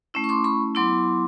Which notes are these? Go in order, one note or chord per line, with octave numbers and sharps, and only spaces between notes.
A3 C#4 E4
C#6
C6 D6
B5 C#6
F#3 B3 E4 C6 D6